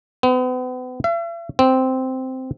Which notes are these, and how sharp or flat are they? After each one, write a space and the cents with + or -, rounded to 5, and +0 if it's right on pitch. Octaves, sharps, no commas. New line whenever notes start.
B3 +40
E5 +45
C4 -5